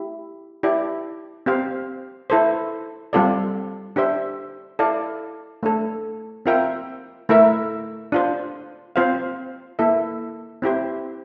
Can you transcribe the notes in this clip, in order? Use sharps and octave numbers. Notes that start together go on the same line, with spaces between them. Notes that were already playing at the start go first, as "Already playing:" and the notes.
Already playing: E4 G4
E4 G4 D5
C4 G4 C5 F5
E4 A4 C5
G3 C4 F4 A4 D5
D4 G4 C5 E5
E4 A4 D5 F5
A3 D4 A4
C4 F4 A#4 E5 G5
A3 E4 A#4 E5
D4 F4 C5
C4 F4 C5 F5
A#3 E4 A4 E5
C4 E4 G4 C5